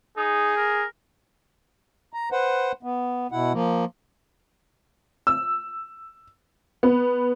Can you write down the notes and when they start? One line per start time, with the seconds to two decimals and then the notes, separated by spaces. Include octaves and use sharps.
0.17 D#4 G#4
0.57 A#4
2.14 A#5
2.32 B4 C5 F#5
2.83 B3
3.32 B2 E4 F#5
3.53 F3 A#3
5.27 E6
6.83 B3